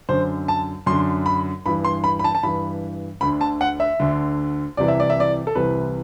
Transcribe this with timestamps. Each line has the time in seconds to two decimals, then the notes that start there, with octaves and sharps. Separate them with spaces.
0.09 F#2 D3 C5
0.48 A5
0.86 F#2 D3 C6
1.26 B5
1.66 G2 E3 B5
1.85 C6
2.04 B5
2.19 B5
2.24 A5
2.35 A5
2.43 G2 E3 B5
3.21 D2 D3 B5
3.41 A5
3.61 F#5
3.80 E5
4.00 D2 D3
4.77 C2 C3 E3 D5
4.88 E5
5.00 D5
5.10 E5
5.20 D5
5.47 A4
5.55 C2 C3 E3 B4